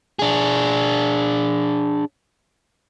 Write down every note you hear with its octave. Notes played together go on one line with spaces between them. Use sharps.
D4 G#4